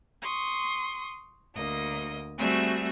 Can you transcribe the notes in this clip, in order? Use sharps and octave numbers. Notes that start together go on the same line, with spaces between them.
C6 C#6 D#6
D2 A#3 D#5
G3 A3 C4 F#4 G#4 E5